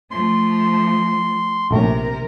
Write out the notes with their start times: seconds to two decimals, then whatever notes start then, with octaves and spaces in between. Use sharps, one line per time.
0.11 F3 A3 C6
1.71 A#1 C3 A3 C#4 A#4